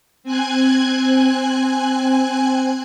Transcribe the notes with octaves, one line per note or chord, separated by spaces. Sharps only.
C4 G#5 F#6 G#6